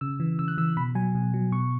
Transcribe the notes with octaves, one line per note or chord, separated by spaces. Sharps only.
C#3 E6
E3
C#3 E6
F#6
E3 E6
B2 B5
F#3 G#5
B2
F#3
B2 C#6